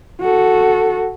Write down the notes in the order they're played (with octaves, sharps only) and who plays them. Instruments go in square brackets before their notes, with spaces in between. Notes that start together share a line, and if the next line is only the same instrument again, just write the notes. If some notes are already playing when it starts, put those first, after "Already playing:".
[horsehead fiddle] F#4 A4